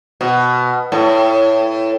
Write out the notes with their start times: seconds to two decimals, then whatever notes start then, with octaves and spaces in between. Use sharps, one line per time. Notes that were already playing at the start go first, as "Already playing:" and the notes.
0.21 B2
0.92 A2